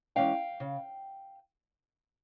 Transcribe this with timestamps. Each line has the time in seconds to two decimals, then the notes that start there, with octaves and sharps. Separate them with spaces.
0.16 E3 G#3 C#4 F5 G5
0.60 C#3